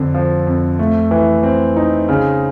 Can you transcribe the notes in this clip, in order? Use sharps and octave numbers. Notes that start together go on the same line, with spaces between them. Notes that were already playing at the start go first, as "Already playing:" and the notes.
Already playing: F2 D3
F3
F2
A3
E3
C4
D#4
C#3